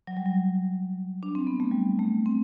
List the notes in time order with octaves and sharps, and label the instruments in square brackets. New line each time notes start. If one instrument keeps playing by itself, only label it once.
[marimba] F#3
G3
F#3
D4
C4
B3
A3
G3
A3
C4